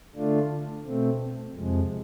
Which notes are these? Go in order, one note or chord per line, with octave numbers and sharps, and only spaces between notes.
D3 A3 D4 F4
B2 A3 C4
F2 C3 F3 G#3